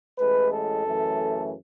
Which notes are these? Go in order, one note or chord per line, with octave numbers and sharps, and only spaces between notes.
A1 A2 G#3 B4
A4
F#2 C#3 E3 A3